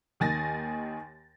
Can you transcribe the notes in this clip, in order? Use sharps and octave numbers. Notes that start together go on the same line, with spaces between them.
D#2 D#3 G#5 A6 A#6